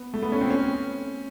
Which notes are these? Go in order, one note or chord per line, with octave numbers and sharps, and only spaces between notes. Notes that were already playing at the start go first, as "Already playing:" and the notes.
Already playing: B3
A3
B3
C#4
C4
C#4